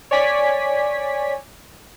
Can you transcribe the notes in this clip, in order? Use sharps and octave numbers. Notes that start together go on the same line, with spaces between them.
C#5 D5 G#5 B6